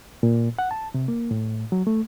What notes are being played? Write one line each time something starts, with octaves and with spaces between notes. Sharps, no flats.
A#2
F#5
A5
C3
A#3
A2
F#3
A3